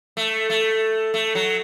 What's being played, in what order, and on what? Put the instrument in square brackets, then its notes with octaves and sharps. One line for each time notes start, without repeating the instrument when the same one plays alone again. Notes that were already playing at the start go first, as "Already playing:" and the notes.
[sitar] A3
A3
A3
F#3